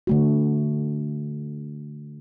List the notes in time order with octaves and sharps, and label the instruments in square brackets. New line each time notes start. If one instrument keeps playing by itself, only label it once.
[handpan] D3 A3 F#4